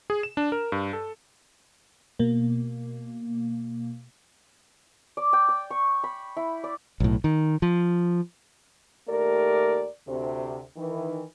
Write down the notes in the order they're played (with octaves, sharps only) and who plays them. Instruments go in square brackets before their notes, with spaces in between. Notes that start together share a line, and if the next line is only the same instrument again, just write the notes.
[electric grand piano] G#4
E7
D4
A#4
G2
A4
[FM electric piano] B2 A#3
[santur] D5
G5
D6
C#6
B5
E4
D5
[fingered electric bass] B1 A2
D#3
F3
[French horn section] D#2 A3 G4 A#4 D5
D2 C3
D#3 E3